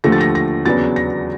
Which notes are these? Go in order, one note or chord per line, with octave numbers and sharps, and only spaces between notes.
D#2 D3 F3 A3 A#6
A6
A#6
A#6
E2 C#3 F#3 B3 D4 A6
A#6